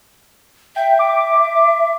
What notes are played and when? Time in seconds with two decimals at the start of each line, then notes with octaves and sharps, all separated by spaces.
0.76 E5 G5
0.99 D6